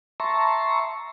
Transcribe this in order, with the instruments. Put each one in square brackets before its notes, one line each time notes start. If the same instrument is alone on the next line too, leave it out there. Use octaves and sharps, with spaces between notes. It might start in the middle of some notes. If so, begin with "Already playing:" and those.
[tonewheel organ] E5 A5 A#5 C6 C#6